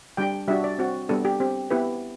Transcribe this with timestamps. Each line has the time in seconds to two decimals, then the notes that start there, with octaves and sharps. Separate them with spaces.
0.17 G3 D4 G4 G5
0.48 G3 D4 F#4 E5
0.64 D5
0.79 C4 F#4
1.09 G3 B3 D4 A4
1.25 G4
1.40 C4 G4
1.70 B3 E4 G4 B4